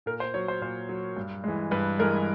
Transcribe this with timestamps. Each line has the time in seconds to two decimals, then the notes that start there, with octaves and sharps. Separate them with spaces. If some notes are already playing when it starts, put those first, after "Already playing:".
0.06 A#2 A#4
0.20 C5
0.34 F#3 C#5
0.48 C5
0.61 A#2 C5
0.89 F#3
1.17 G2
1.44 E3 G#3
1.71 G2 B4
1.99 E3 G#3 A#4